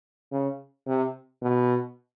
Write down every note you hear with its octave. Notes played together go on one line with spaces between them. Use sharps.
C#3
C3
B2